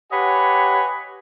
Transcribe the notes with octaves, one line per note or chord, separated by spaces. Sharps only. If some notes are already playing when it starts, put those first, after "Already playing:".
G4 B4 C#5 D#5 F#5 G#5